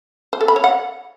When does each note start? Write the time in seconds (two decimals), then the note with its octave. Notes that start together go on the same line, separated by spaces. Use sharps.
0.33 C5
0.41 A4
0.48 B5
0.56 C#5
0.64 F#5